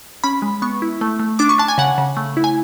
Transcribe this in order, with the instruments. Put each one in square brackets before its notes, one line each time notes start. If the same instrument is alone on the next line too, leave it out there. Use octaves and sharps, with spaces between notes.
[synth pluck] C#4 B5
G#3
B3 C#6
E4
A3
A3
D4 D6
C#6
D4 A5
G#5
C#3 F#5
C#3
A3
E4
G#5